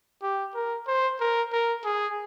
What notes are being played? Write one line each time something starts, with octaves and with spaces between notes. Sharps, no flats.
G4
A#4
C5
A#4
A#4
G#4